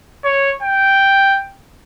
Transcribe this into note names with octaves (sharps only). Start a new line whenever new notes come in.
C#5
G5